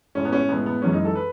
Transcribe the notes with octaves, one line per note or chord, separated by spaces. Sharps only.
A2 G#3 C#4
B3
C#4
A2 G#3 B3
B3
F#2 E3 G#3 C#4
D#4
A4
B4